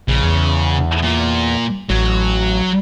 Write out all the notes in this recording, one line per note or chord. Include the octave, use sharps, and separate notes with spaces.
A#1 C#3
E2
A#2
A1 F#3